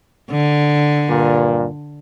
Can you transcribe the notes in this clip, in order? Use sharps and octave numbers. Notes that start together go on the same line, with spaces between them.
D3
G2 A#2